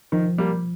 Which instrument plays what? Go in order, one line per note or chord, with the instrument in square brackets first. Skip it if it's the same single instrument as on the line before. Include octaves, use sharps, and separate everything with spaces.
[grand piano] D#3 [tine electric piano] F3
[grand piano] G3 A#3